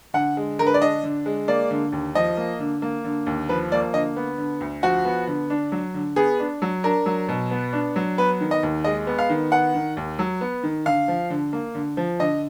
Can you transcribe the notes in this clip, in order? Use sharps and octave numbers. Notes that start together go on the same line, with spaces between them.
D3 F#5
G#3
D3 A#4
B4
D5
D4 D#5
D3
G#3
A#3 D5
D3
D#2
F3 D#5
A#3
D3
A#3
D3
D#2
F3 B4
A#3 D5
D3 D#5
B3
D3
D2
F3 F#4
B3
D3
D4
F#3
D3
B3 G#4
D4
F#3
D4 A#4
F#3
B2
B3
D4
F#3
B3 B4
D#3
D#5
D#2
G#3 D#5
B3
F5
D#3
B3 F#5
D#3
D#2
F#3
B3
D#3
D3 F5
F3
D3
A#3
D3
F3
D3 D#5